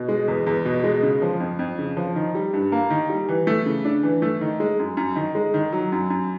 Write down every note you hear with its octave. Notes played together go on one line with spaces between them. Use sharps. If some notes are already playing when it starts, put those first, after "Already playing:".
Already playing: B2
G#3
E2
E2
B2
G#3
C#3
F3
F2
F2
C#3
F3
D#3
G3
G2
A#3
D#3
G3
E3
A3
C#3
D4
E3
A3
D#3
G#3
F#2
F#2
D#3
G#3
D#3
F#3
F#2
F#2